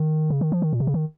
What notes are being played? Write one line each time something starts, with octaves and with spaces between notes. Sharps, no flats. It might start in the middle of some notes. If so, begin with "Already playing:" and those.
Already playing: D#3
C#3
D#3
F3
D#3
A#2
C3
C#3
D#3